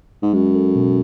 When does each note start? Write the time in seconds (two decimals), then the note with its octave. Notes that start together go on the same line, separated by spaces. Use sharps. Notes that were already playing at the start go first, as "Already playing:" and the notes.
0.22 G#2
0.33 F#2 G#3
0.55 A4
0.76 B2